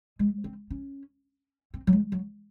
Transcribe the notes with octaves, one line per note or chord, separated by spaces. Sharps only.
G#3
C4
C#4
C4
F#3
G#3
F#3